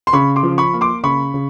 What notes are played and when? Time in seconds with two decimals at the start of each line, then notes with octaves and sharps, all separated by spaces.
0.07 C6
0.13 C#3 B5 C#6
0.36 C6 D6
0.43 F3
0.58 B5 C#6
0.73 A#3
0.81 C6 D6
1.04 C#3 B5 C#6
1.34 C#3